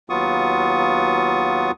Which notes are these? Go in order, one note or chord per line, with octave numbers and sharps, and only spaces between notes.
D#2 F#3 B3 F4 C#6 D#6